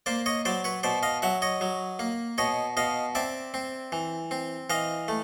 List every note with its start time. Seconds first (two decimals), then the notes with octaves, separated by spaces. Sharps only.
0.06 A#3 C5 D5
0.26 C#5 D#5
0.45 F#3 C5 D5
0.64 B4 C#5
0.83 B2 C5 D5
1.03 D#5 F5
1.22 F#3 E5 F#5
1.42 C#5 D#5
1.61 F#3
1.99 A#3
2.38 B2 C#5 D#5
2.77 B2 D#5 F5
3.15 C4 D5 E5
3.54 C4
3.92 E3
4.31 C4
4.70 E3 D#5 F5
5.08 A3